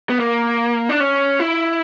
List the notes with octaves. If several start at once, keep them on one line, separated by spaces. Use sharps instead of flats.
B3
A#3
D4
C#4
E4